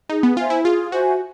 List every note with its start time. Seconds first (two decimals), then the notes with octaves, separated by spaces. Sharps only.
0.09 D#4 G#4
0.23 B3
0.36 F4 C5 E5 G#5
0.50 E4
0.64 F4 G#4
0.91 F#4 C5 E5 G#5